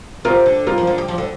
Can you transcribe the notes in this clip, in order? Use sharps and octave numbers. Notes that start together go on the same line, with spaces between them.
C3 F4 A#4
D3
G3 F4 A#4
F3
D3
G3
F3
D3